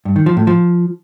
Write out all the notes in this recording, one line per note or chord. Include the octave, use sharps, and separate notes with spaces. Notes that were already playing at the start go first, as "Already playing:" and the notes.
G2
D#3
F3
A2
F3